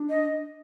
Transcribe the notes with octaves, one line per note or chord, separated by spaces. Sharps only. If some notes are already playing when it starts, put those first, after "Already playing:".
Already playing: D4
D#5